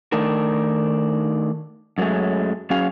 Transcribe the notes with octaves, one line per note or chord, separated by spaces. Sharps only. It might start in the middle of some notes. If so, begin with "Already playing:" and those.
D#3 A3 D4 D#4 A#4
F#2 F#3 G#3 A3 C#4
F#3 C#4 F#4 G#4 F5